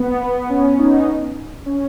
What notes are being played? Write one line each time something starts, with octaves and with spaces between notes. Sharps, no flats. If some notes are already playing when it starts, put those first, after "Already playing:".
Already playing: B3
B3
C#4
D#4
C#4